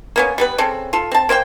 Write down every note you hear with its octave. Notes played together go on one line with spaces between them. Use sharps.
A#3 B3 C#4
G3 B3 B4
C#3 C4 A4
F4 A4
C4 A5
A#3 C5 D5 G5